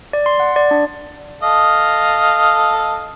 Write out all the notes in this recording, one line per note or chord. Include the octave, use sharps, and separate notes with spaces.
D5
C6
F#5
D5
D4
A4 D#5 F5